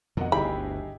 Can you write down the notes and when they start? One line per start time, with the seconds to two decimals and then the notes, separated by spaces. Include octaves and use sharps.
0.17 F2 B2 D3 A#4 D#5 F#5
0.32 G1 D2 D3 D#4 E4 G4 G#4 B5